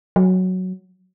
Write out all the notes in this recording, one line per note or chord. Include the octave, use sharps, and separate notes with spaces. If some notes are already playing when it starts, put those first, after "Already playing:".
F#3